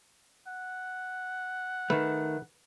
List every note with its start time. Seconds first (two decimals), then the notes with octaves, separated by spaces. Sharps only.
0.48 F#5
1.90 D#3 A3 B4